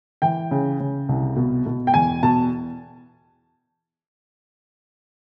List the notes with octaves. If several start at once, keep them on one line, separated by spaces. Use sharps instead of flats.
E3 G5
C#3
C#3
C2
B2
B2
G5
E2 G#5
B2 A5